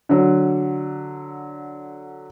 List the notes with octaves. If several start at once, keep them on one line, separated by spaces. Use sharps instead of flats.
D3 F#3